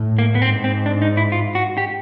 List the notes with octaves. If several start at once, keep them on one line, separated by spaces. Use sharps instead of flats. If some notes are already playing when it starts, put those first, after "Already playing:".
Already playing: A2
A#3
B3
G#2 C4
C4
D4
D#4
E4
F4
F#4
G4